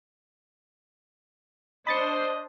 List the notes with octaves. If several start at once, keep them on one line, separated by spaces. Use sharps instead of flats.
D4 C5 D#5 B5 A6 C#7